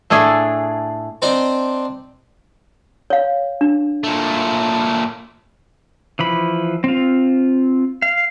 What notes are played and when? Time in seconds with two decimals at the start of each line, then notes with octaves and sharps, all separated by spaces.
0.10 A2 A3 D4 G#4
1.22 C4 D4 D#4 C5
3.10 C#5 F5
3.61 D4
4.03 A#2 A3
6.19 E3 F3 B5
6.84 C4 F4
8.02 F5